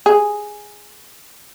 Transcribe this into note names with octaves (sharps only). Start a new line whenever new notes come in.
G#4